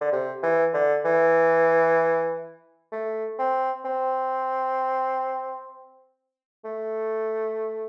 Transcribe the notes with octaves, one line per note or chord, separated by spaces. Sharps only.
D3
C3
E3
D3
E3
A3
C4
C4
A3